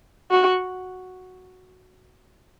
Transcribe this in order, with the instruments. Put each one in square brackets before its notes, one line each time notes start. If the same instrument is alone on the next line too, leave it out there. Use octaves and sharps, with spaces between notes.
[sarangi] F#4